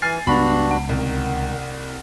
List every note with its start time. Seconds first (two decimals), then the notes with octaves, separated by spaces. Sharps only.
0.02 E3 G#5 F6 A6 C7
0.27 C#2 G2 B3 D4 F#4 A5 B5
0.71 F#5
0.89 C2 D#3